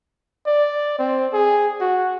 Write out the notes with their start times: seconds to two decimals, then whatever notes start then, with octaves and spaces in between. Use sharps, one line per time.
0.47 D5
0.99 C4
1.33 G#4
1.81 F#4